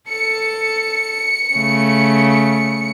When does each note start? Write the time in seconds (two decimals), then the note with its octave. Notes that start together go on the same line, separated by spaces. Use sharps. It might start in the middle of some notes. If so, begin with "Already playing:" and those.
0.10 A4 C#7
1.55 C#3 A3